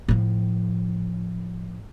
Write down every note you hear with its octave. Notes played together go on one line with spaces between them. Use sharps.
A2 F3